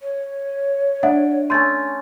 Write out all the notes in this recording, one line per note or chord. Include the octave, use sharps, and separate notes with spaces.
C#5
D4 E5 F#5
A3 C#4 C6 G6 A6